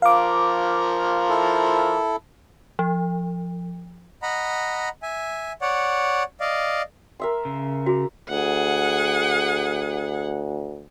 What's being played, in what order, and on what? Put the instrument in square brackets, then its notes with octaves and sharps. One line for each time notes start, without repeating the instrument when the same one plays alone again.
[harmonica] F3 A#4 [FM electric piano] F5 D6
[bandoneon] E4 A4
[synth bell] F3
[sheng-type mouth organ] D#5 F#5 A#5 B5
E5 G#5
C#5 D5 F#5
D5 D#5 F5
[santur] A#4 E5 C6
[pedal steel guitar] C#3
[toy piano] F#4 G#4 [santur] A#5
[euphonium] D2 [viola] G#4 F#5